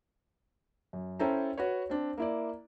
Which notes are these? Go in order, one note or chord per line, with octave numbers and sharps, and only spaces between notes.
F#2
C#4 E4 A4 C5 G5 A#5
F#4 B4 C#5
C4 D4
A#3 E4 D5